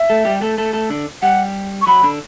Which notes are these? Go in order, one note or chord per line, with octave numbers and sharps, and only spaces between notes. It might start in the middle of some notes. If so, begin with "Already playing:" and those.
Already playing: E5
A3 A4
G3 G4
A3 A4
A3 A4
A3 A4
D3 D4
G3 G4 F#5
C#6
F#3 F#4 B5
D3 D4